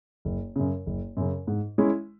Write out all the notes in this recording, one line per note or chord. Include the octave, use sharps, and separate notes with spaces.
F#1
F#2 C#3
F#1
F#2 C#3
G#2
G#3 C#4 E4